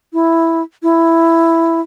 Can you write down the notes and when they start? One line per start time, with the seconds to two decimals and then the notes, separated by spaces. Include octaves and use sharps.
0.13 E4
0.83 E4